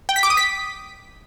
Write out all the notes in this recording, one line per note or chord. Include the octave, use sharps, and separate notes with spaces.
G5
B6
D6
D#6
B6